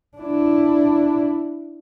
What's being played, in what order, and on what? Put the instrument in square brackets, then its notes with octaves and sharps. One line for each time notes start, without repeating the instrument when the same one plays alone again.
[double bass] D4 E4